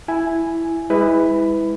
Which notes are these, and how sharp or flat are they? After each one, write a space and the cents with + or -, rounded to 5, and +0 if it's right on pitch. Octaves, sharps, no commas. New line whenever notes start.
E4 +5 G#5 +0
G#3 -30 E4 -15 B4 +10